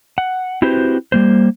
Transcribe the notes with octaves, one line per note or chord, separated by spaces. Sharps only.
F#5
C4 E4 F#4 G4 B4 C5
G3 A#3 C5